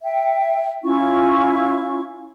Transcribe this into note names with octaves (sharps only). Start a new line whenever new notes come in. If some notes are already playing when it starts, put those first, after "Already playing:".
E5 G5
C#4 E4 F4 C#6